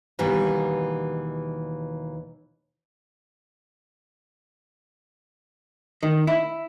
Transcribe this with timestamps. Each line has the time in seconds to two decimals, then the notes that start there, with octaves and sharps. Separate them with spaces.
0.19 D#2 B2 E3 G3
6.03 D#3
6.27 E4